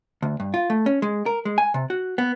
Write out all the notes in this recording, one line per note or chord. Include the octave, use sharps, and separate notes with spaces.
D2
G2
F4
A3
C#4
G#3
A#4
G#3
G#5
C3
F#4
B3